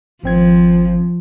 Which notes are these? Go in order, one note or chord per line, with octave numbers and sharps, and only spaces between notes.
G#1 F3 C4 G#6